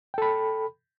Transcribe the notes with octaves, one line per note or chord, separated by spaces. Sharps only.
A4 G5 B5